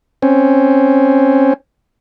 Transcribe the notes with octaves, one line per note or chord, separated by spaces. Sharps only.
C4 C#4